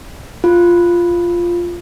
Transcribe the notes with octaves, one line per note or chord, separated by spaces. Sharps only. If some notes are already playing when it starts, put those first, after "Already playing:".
F4